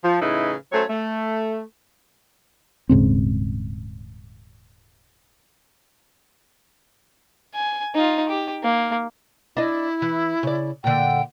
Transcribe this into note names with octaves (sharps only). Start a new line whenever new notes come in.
F3
A2 C#3 E3 D#4 E4 B4
F#3 A3 C#4 C5 C#5
A3
D#1 G#2 C#3 C4
G#5
D#4 F4
G4
A#3
D4 E4 D#5
E3
C#3 D5
A#2 D3 G5